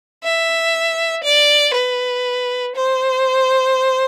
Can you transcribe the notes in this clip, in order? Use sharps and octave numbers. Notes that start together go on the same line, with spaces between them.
E5
D5
B4
C5